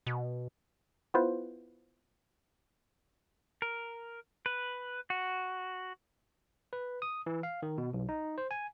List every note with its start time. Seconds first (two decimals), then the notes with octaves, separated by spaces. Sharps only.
0.07 B2
1.14 B3 E4 F4 B4 C5
3.62 A#4
4.46 B4
5.10 F#4
6.73 B4
7.02 D#6
7.26 E3
7.43 F5
7.63 D#3
7.78 B2
7.94 B1
8.09 D#4
8.38 C5
8.51 G#5